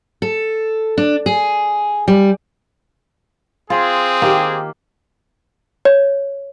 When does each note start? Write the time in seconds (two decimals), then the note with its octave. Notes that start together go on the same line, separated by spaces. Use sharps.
0.22 A4
0.97 D4
1.26 G#4
2.08 G3
3.70 C4 F4 G#4
4.22 D#3 A#3 G4
5.85 C#5